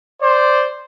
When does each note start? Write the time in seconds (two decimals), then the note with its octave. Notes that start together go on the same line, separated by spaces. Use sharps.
0.22 C5 D5